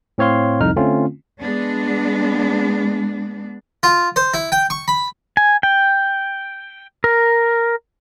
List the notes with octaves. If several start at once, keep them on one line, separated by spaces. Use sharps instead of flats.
A2 C4 C#5 F5 C6
C2 F2 D#4 F6
D3 A3 C4 C#4 F4
G#3 B3 D4
F4
C5
E4
G5
C#6
B5
G#5
G5
A#4